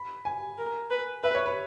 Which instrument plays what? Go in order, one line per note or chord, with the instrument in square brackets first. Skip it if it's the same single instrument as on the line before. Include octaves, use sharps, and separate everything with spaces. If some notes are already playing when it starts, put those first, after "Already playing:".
Already playing: [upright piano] B5
G#5
[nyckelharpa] A#4
B4
[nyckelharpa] B4 [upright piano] E5
[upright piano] C#5
B4